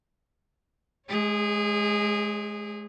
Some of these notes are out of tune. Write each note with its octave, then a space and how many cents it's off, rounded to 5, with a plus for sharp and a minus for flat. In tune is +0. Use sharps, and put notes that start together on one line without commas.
G#3 +25 G#4 -25 C#5 +0